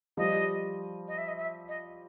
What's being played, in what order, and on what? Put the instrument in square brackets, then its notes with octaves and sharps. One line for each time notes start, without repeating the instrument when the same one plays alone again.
[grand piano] F3 G3 [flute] D#5
[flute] D#5
E5
D#5
E5
D#5